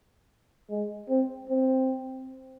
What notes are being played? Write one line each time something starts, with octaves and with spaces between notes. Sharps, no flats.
G#3
C4
C4